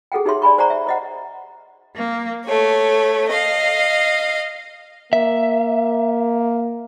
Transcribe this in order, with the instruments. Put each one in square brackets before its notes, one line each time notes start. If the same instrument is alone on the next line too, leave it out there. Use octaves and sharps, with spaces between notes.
[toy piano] G#4 A4 F#5 G5
D#4 G4 G#4 C#5 E5 C6
D5 G#5 B5 C#6
C5 D5 F#5 G#5 A#5 C#6
E5
C5 D#5 F#5
[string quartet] A#3
A3 C#5
D#5 F5
[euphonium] A#3 [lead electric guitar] E5